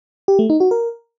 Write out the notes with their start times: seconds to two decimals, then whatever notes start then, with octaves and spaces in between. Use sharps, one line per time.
0.28 G4
0.39 A3
0.50 D#4
0.60 F#4
0.71 A#4